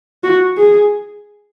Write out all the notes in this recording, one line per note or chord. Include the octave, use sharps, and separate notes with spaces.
F#4
G#4